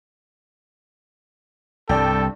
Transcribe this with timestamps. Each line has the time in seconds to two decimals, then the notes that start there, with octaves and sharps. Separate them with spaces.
1.89 C2 G2 A4 D5 G5